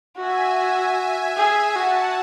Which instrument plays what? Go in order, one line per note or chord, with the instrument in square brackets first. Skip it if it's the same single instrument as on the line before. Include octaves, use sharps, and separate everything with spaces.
[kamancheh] F#4 [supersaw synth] E5 G#5
[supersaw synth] E5 G#5
[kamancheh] G#4
[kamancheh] F#4 [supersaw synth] F#5 A5